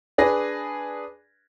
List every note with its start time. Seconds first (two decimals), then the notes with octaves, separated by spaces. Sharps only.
0.18 D4 G#4 B4 A#6